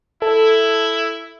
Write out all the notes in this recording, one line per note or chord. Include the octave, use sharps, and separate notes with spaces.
E4 A4